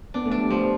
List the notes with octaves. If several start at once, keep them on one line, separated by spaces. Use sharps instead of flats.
B3 D4
A3
D4
G3
F3 G3